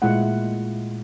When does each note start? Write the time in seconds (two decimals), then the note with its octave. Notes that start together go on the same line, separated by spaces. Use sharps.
0.02 A#2 G#3 A3 E4 F4 F#5